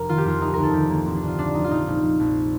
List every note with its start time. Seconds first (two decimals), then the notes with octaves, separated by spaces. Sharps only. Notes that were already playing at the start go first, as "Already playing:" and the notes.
Already playing: F1 A#4
0.09 D#3 F4
0.18 G4
0.25 F2 F4
0.41 D2 D#4
0.54 D2 A#4
0.63 A4
0.73 D2 G4
0.89 D2 A#3
1.06 A1 C4
1.17 D4
1.22 A1
1.28 F4
1.38 A1 D4
1.54 F3 D#4
1.64 F4
1.70 A#1 D#4
1.87 A#1
2.03 A#1
2.20 A#1